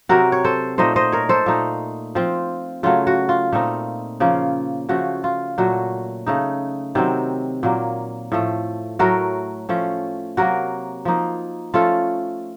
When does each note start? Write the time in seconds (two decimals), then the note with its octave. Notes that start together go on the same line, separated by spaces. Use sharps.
0.09 C3 F#3 C4 F#4 A#4
0.32 C#5
0.44 A4 C5
0.78 A#2 A3 D#4 C5 D#5
0.96 C5 D#5
1.12 A#4 C#5
1.29 A4 C5
1.46 A#2 A3 D#4
2.15 F3 C4 F4
2.83 C#3 F#3 A3 F4
3.07 F#4
3.29 F4
3.53 A#2 A3 C4 D#4
4.20 C#3 F3 A#3 C#4
4.89 C#3 F3 A3 F#4
5.24 F4
5.58 A#2 F#3 A3 F#4
6.27 C#3 A3 D#4
6.95 C3 D#3 F#3 C4
7.63 A#2 F#3 A#3
8.32 A2 F3 A3
8.99 A2 F#3 A3 F#4 A#4
9.69 F3 A3 C#4
10.37 C3 F#3 A#3 F#4 A#4
11.05 F3 A#3 D#4
11.74 F3 A3 C#4 F4 A4